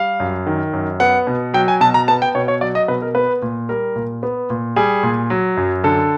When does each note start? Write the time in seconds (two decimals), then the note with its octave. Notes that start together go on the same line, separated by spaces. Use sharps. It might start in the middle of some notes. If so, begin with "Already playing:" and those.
Already playing: G3 F5
0.20 F#2
0.47 D#3
0.73 F#2
1.00 B3 F#5
1.27 B2
1.54 F#3 G5
1.68 G#5
1.81 B2 A5
1.94 A#5
2.08 B3 A5
2.22 G5
2.35 B2 C#5
2.48 C#5
2.61 F#3 D5
2.75 D#5
2.88 B2 B4
3.02 A#4
3.15 B3 B4
3.42 A#2
3.69 G3 A#4
3.96 A#2
4.23 B3
4.50 A#2
4.76 G3 G#4
5.03 A#2
5.30 F#3
5.57 F#2
5.84 D3 A4